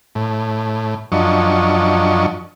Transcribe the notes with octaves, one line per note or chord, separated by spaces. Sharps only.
A2
F#2 F3 D4 D#5 C#6